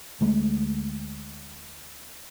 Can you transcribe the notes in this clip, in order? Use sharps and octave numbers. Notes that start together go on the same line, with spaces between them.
D2 G#3 A3